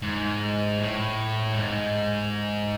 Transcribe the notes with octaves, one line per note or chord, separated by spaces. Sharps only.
G#2
A2
G#2